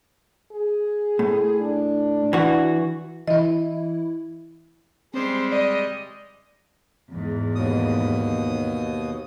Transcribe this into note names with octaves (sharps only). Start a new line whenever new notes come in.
G#4
A2
D4
E3 F#4
E3 E4 D#5
G3 G#3 C4 C5
D5 D#5
E2 G#2
D#2 B2 D#6